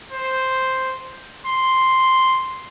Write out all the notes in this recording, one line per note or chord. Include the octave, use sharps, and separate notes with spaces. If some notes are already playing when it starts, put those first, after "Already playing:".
C5
C6